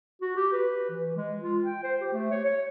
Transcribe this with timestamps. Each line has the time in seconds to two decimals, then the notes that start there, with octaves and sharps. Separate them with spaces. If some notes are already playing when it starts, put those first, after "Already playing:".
0.21 F#4
0.36 G4
0.52 B4
0.90 E3
1.16 G#3
1.41 F4
1.64 G5
1.83 C5
2.01 G4
2.13 A3
2.31 C#5
2.45 C#5